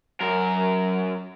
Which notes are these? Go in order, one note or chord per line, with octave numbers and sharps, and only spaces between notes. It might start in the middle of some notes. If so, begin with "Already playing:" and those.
F#2 A#4